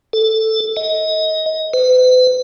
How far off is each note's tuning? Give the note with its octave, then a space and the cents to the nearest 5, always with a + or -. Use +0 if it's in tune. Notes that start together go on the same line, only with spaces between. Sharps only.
A4 +5
D#5 +25
B4 +45